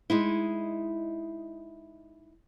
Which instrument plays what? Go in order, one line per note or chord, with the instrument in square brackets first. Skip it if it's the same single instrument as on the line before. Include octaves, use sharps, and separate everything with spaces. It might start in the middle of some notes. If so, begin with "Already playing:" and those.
[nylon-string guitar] G#3 D#4 E4